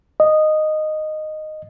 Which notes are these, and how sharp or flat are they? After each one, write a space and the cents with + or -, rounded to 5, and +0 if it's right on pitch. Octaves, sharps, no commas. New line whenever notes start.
D#5 -10